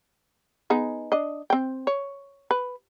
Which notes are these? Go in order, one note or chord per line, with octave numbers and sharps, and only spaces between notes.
B3 D#4 G#4
D4 D#5
C4 G5
C#5
B4